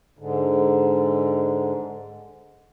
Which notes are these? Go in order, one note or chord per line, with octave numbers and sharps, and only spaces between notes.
G#2 D3